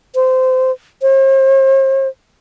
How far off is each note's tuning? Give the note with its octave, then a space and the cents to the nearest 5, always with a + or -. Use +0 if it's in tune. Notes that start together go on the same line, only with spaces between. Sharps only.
C5 -20
C5 +45